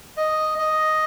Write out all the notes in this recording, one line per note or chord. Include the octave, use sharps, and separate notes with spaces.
D#5
D#5